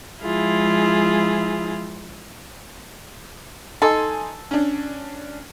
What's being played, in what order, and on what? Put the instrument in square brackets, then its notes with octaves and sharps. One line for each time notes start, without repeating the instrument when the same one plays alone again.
[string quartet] F3 G#3 E4 F4 G#4
[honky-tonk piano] D#4 G#5 C6 [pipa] A4
[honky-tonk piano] C#4 D4